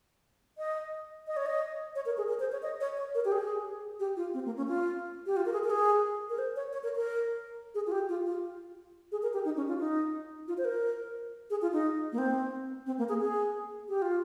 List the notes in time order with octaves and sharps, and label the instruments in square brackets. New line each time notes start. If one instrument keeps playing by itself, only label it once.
[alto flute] D#5
D#5
C#5
D#5
C#5
A#4
G#4
A#4
C5
C#5
D#5
C#5
C#5
A#4
G4
G#4
G4
F4
C4
A#3
C#4
F4
G4
F4
A#4
G#4
A#4
G#4
A#4
C5
C#5
C#5
A#4
A#4
G#4
F4
G4
F4
F4
G#4
A#4
G4
D#4
C#4
F4
D#4
F4
C5
A#4
G#4
F4
D#4
A#3
C4
C4
A#3
G#4
G#4
G4
F4